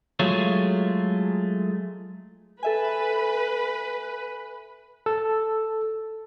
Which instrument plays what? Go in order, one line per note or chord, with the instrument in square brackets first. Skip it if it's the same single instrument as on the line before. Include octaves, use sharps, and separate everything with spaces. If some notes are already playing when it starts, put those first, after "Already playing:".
[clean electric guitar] F#3 G#3 A3 F4 C#5
[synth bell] A4 E5 G#5 [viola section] B4
[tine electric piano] A4